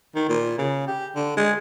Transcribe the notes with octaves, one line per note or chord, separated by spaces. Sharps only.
D#3
A#2
C#3
G4
D3
G#3